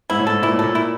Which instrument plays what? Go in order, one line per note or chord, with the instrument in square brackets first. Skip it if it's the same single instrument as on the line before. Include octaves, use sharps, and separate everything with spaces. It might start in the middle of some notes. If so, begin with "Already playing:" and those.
[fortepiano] G#2 [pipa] E4
[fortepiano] A2
[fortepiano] G#2 [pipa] A4
[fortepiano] A#2 [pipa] E4
[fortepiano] A2
[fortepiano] A#2 [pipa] A4
[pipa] E4